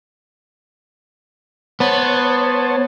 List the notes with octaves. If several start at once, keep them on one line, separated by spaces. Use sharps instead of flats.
B3 C5 C#5 A5